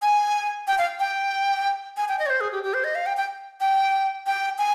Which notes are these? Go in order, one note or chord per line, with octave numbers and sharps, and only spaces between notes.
G#5
G5
F5
G5
G#5
G5
D#5
C#5
C5
G#4
G4
G4
C5
D#5
F5
G5
G5
G5
G5
G#5